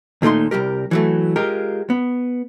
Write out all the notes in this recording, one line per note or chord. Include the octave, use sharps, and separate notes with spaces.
D#2 A#2 A3 D#4 C6
C2 C3 G3 G4 A#4
E3 F#3 A3
G#3 F4 G4 A#4
B3